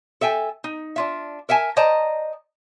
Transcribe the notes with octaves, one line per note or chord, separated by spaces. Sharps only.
A4 E5 G5 G#5
D#4
D4 F4 E5
A#4 E5 F#5 G#5 A5
C5 D5 D#5 A5 A#5